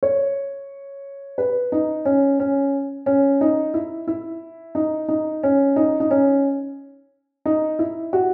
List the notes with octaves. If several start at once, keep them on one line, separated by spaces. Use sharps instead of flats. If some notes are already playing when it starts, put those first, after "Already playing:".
C#5
B4
D#4
C#4
C#4
C#4
D#4
E4
E4
D#4
D#4
C#4
D#4
D#4
C#4
D#4
E4
F#4